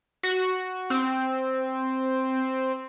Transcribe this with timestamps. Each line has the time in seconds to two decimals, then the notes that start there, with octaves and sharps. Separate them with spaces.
0.23 F#4
0.90 C4